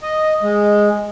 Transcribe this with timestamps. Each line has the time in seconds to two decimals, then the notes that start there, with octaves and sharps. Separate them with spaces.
0.02 D#5
0.42 G#3